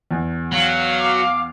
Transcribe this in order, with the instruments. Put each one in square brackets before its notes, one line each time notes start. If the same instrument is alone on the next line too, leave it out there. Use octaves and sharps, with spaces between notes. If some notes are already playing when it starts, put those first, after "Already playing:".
[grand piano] E2
[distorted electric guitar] F#3 [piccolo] F5
[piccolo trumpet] D6